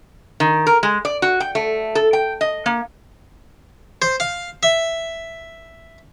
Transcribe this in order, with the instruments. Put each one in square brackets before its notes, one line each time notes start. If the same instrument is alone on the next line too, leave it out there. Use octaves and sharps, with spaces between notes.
[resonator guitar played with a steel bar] D#3
A#4
G#3
D5
F#4
G5
A3
A4
G5
D#5
A#3
[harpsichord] C5
F5
E5